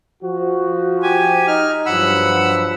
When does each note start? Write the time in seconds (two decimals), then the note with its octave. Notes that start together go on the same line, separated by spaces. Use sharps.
0.22 F3 F#4
1.03 G4 G#5
1.47 D#4 F6
1.86 G2 F3 F#3 F#5 B5 E6